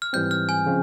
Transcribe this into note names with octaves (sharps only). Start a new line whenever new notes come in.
F6
G#2 E3 G3 C4 G6
F6
G#5
C#3 F3 C4